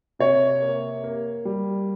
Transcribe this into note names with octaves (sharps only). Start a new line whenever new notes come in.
C3 C#5
A#3
A#3
G3